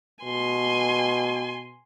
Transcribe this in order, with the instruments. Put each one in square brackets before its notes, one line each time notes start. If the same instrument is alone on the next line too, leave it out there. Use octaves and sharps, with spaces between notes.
[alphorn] B2 [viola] G#5 C6